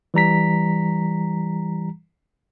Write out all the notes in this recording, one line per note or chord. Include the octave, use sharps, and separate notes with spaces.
E3 G3 A#5 B6